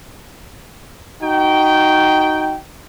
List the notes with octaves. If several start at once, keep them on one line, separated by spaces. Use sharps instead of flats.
D#4 F#4 G5